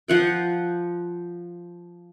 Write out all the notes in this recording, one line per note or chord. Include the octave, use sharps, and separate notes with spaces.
F3 F#5 G5